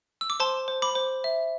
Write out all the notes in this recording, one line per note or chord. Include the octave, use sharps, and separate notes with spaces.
E6
D6
C5 A5 C6
C5
B5 D6
C5
E5